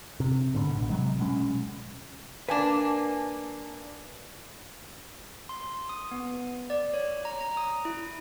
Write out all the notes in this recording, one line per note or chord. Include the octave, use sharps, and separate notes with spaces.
C3
G#2 B2 D3
A1 B2
C3 F#3 G#3
B2 G#3 C#4
A#3 D4 B4 G#5 A5
C6
D#6
B3
D5
C#5
A#5
A#5
D#6
E4